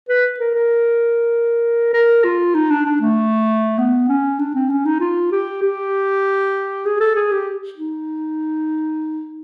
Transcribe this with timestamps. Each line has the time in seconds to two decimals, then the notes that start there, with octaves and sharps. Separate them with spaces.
0.09 B4
0.40 A#4
0.55 A#4
1.94 A#4
2.25 F4
2.55 D#4
2.71 D4
2.86 D4
3.01 A3
3.79 B3
4.09 C#4
4.39 D4
4.55 C4
4.70 C#4
4.85 D#4
5.00 F4
5.32 G4
5.62 G4
6.86 G#4
7.00 A4
7.16 G#4
7.32 G4
7.77 D#4